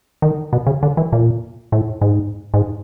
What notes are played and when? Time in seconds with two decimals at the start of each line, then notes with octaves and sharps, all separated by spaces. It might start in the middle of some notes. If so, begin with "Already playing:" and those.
0.22 D#3
0.53 B2
0.67 C#3
0.83 D3
0.97 E3
1.12 A#2
1.72 A2
2.01 G#2
2.54 G#2